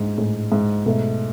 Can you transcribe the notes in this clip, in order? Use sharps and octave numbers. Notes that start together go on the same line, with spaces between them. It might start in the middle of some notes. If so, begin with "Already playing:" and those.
Already playing: G#2 D4
A2 G#3
G#2
B2 A3